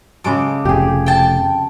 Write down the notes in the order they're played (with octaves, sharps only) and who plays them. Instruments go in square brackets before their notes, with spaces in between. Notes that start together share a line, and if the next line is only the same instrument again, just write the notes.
[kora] C#3 G#3 A4 [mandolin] D6
[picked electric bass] F1 F2 [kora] G4 G#4
[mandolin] G5 A5